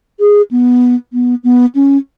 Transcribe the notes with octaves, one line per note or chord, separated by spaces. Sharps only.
G#4
B3
B3
B3
C#4